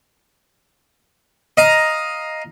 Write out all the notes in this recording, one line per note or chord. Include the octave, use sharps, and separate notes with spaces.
D#5 F5 A#5